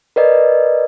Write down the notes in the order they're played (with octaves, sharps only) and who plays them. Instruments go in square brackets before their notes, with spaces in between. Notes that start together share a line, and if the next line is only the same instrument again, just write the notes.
[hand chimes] A#4 B4 D5 D#5